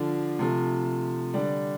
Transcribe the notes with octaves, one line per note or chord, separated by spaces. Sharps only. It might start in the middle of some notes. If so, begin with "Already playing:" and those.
Already playing: D3 F3 D4
C3 F3 A3
D3 G3 D4